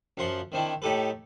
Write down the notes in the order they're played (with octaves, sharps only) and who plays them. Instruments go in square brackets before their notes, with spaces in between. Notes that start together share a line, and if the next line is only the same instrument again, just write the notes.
[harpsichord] F#2 F3 F#5 C6
D#3 C4 D4 E4
A2 D#4 G4 A4 B4